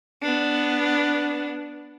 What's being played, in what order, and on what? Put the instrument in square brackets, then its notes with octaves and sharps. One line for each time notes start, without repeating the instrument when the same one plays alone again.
[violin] B3 D4